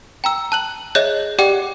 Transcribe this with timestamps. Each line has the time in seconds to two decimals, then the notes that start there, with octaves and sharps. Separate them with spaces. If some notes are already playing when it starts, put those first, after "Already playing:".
0.24 G5 A#5 E6
0.52 A5 F#6 F#7
0.95 G#4 C#5 D#5 E5 F#6 G6
1.39 G4 D5 F#5 G5 D6